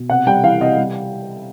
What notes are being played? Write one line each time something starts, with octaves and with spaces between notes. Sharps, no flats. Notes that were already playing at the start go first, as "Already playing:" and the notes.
Already playing: B2
C3 F#5
G3 G5
E3 F5
C3 D#5
G3